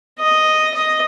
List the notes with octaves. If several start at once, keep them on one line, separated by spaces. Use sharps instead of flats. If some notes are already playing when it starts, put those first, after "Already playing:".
D#5
D#5